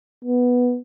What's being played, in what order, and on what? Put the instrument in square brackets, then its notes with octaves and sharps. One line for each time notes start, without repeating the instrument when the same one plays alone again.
[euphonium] B3